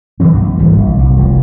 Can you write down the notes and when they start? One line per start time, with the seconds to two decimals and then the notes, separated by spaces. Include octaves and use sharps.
0.20 G2 E3 F#3 C4
0.34 A#1
0.58 G#1 E3 G3
0.76 A#1
0.98 C2
1.16 F1 F3